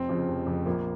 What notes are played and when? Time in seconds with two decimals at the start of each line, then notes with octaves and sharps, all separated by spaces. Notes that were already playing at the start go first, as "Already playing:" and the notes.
Already playing: F1 C4
0.09 F2 C#3 F3
0.28 F1
0.47 F2 C#3 F3
0.66 A#1 A#3